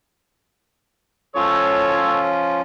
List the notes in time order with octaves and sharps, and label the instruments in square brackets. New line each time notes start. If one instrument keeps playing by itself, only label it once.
[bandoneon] F3 C#4 F4 [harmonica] A4 C#5 E6